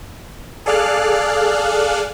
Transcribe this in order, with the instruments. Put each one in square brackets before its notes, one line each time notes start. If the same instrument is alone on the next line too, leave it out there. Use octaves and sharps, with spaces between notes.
[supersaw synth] G#4 A4 D5 F5 F6 F#6